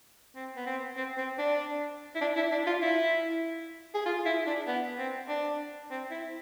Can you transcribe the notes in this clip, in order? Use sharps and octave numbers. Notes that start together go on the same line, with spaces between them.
C4
B3
C4
C4
C4
D4
E4
D4
E4
D4
F4
E4
G#4
F4
E4
D4
B3
C4
D4
C4
E4